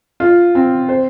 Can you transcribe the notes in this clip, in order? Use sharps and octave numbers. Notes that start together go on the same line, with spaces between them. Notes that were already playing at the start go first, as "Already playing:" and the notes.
F4
C4
C5